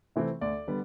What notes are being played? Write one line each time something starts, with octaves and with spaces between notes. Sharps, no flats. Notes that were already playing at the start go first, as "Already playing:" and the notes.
C3 E3 A3 C4
D2 D5
D3 G3 B3